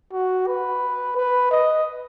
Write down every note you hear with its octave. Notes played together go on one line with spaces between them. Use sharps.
F#4
B4
B4
D#5